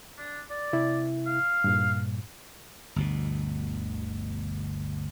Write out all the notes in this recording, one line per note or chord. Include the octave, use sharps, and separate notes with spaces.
D4
D5
C3 E4
F5
G2 A#2
G1 D2 B2